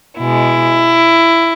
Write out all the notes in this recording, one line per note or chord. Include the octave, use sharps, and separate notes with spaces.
B2 G#3 E4